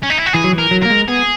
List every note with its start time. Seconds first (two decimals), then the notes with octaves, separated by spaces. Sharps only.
0.03 C#4
0.10 D#4
0.18 E4
0.26 F#4
0.33 E3 G#4
0.44 F#3
0.53 E3
0.59 A#4
0.71 F#3
0.83 A#3 A#4
0.90 G#3
1.08 B3 G#4